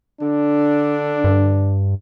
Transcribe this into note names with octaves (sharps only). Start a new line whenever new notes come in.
D3 D4
G2